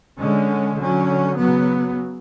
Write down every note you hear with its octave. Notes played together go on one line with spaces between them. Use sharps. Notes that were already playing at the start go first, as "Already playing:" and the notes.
D3 G#3 C#4
D3 F#3 C#4
C#3 F#3 B3